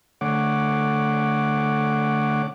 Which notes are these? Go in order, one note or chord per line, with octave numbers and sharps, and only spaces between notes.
D3 A3 C#5 F#5 D6